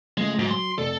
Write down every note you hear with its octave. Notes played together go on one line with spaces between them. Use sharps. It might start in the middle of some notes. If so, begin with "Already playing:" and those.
C#3 F3 G#3 A3
G#2 F#3 D7
C6
F1 A4 D5